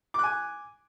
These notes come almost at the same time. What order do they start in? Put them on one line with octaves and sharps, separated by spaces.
D6 F#6 G#5